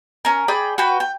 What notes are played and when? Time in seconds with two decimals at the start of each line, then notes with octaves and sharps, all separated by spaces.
0.25 C#4 A#4
0.48 G#4 D5 G5 B5
0.78 F#4 B4 G5
1.00 G5